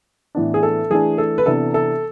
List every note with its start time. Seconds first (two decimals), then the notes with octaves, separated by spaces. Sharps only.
0.35 A2 E3 B3 D4
0.54 G#4
0.63 A4
0.90 E3 A3 D4 G#4
1.18 A4
1.38 B4
1.46 C3 E3 B3 D4 A4
1.74 A4